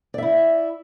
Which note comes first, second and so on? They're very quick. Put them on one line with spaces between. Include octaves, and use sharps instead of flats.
D5 E5 E4